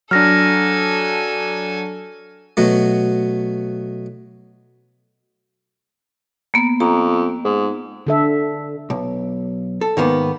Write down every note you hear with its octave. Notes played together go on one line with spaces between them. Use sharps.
F#3 D4 A4 G#5 F6 A#6
B2 F#3 A3
A#3 B3
F2 A#5
G#2
D3 A4 E5
B1
A4
G#2 D#3 A#3 B3